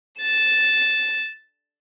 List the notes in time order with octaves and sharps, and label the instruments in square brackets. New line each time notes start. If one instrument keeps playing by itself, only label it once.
[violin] A6 E7